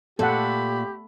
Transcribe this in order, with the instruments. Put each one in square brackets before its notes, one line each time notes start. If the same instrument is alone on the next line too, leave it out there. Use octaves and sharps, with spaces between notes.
[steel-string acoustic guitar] A#2 [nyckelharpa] A3 B5 [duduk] G4 [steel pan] A4 F#5